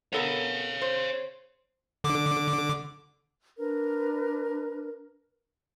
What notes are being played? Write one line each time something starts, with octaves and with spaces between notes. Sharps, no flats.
B3 A4 A#4 C#5 F5
C5
D3 D6
D4 A#4 B4